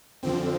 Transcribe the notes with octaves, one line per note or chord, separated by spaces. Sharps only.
F2 D3 F3 C4